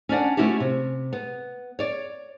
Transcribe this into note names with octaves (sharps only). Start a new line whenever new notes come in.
C#4 D4 D5 F#5
A3 A#3 C#4 E4 F#4 G4
C3
B3
C#5 D5